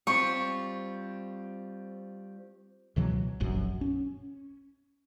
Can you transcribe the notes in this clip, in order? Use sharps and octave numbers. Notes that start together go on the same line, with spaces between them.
G3 C4 F4 C#6
C#2 B2 E3 F#3
F1 A#1 F#2
C#4